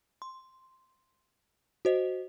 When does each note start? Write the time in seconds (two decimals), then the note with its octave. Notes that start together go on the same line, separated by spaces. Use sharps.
0.22 C6
1.85 F#4 C5 D#5